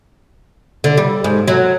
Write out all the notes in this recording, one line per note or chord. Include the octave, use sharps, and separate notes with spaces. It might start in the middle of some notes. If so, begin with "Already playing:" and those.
D3
G3
G#2
F#3